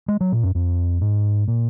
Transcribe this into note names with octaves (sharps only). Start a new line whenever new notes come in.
G#3
F#3
A#2
F#2
F2
G#2
A#2